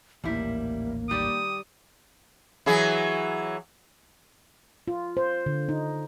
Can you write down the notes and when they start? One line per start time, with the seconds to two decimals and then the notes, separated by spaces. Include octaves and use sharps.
0.24 A1 D#2 A#2 G3 A#3 E4
1.09 D#3 G3 D5 D#6
2.66 E3 F#3 G#4
4.88 F4
5.17 C5
5.46 D3
5.69 D#4